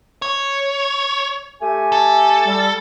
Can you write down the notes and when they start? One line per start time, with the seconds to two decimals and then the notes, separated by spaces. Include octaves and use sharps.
0.22 C#5
1.61 A3 G4 G#5
1.92 A4
2.47 G3